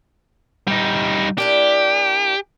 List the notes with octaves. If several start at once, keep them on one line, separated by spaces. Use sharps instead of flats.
G3 D#4
A#3 D4 E4 G4